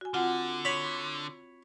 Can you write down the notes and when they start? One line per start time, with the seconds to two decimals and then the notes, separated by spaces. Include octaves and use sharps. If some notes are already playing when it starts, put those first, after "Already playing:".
0.01 F#4 G#5
0.14 D3 C4 F4 F#5
0.65 C#5 B5